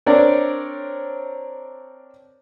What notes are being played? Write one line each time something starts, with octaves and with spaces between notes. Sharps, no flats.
C4 D4 A#4 C#5 D5